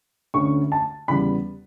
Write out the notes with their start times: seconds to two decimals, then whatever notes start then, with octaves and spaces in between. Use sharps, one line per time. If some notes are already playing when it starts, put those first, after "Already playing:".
0.34 D2 D3 A3 C#4 C#6
0.72 A5
1.08 E2 C#3 G3 B3 B5